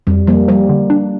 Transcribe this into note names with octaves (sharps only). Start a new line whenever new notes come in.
F2 G3
F3 G3 A#3
F3 G3
D3
D4